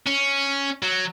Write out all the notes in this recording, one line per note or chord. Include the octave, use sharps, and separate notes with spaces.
C#4
F#3